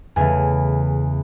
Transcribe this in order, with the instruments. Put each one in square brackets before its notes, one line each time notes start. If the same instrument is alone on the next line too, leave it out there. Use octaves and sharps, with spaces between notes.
[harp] E2 C#3 E3 A3 G#5